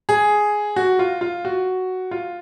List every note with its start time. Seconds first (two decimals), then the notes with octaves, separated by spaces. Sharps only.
0.09 G#4
0.76 F#4
0.99 F4
1.21 F4
1.45 F#4
2.11 F4